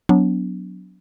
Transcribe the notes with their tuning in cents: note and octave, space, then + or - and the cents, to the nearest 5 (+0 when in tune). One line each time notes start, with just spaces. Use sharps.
F#3 -5 B3 +0 D4 -30